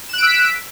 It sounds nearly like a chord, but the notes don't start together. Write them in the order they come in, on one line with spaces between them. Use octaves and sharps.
E7 F#6 D7 E6 B6